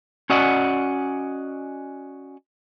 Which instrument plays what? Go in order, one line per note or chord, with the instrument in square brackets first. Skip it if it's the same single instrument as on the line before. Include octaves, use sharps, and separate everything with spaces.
[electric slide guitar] C#4 F#4 D5 D#5 F#5